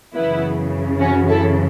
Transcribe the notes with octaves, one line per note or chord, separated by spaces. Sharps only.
F#2 C#3 E3 B3 E4
C#4 F#4
E4 A4